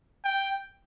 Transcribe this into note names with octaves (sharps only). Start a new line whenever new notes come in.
G5